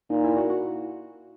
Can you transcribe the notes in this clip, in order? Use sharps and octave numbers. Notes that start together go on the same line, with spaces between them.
A#2 D#4
E4
F#4
F#4